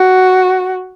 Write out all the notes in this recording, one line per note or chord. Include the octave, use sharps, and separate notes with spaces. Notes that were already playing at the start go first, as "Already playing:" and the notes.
Already playing: F#4